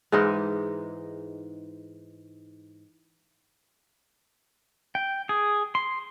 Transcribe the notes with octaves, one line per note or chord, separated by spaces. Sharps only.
G#2 E3 G#3 D#4
G5
G#4
C6